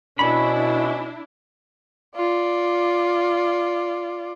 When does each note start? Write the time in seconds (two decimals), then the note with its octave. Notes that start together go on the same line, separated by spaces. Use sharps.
0.19 B2 C#4 D4 E4 B5
2.16 F4 D5